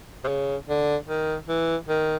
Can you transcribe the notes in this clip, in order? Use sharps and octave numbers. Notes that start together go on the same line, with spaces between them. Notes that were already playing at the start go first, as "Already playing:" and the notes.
C3
C#3
D3
D#3
E3
D#3